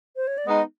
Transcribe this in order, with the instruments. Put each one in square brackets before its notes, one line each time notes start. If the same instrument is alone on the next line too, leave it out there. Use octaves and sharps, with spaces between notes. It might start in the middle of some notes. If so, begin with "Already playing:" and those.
[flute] C5
C#5
D5
[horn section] G#3 B3 D#4 [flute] D#5